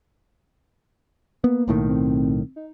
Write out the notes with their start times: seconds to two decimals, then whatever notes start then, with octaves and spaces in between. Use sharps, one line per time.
1.44 A#3 B3
1.68 B1 A2 D#3
1.89 C4
2.56 D#4